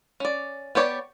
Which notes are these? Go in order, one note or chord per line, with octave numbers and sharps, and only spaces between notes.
C#4 D5
B3 G4 C#5 D5